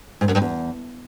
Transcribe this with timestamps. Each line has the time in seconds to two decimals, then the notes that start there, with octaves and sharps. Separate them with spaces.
0.21 G#2
0.28 F#2
0.35 G2
0.42 E2